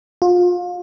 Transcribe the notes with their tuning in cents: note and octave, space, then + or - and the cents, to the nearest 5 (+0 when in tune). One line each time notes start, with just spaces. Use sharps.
F4 +30